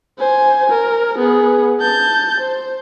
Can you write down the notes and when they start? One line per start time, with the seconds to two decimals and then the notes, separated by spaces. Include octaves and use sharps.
0.19 C5 G#5
0.70 A#4
1.18 B3 G#4
1.81 A5 G6
2.40 C5